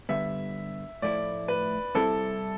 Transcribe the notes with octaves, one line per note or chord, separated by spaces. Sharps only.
G2 D3 G3 B3 E5
A2 F3 A3 E4 D5
B4
C2 C3 G3 C4 E4 A4